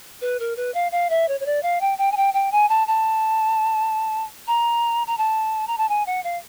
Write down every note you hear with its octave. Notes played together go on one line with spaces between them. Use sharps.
B4
A#4
B4
F5
F5
E5
C#5
C#5
D5
F5
G5
G5
G#5
G5
G5
G#5
A5
A5
A#5
A#5
A5
A#5
A5
G#5
F#5
F5